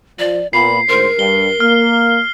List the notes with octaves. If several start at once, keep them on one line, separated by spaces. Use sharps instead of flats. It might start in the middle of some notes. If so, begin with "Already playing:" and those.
F3 D5
A#2 B3 B5 C7
D2 G#2 A#4 C5
G2 G7
A#3 F6